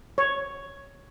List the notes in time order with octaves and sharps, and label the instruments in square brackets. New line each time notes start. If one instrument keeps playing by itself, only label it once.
[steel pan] C#5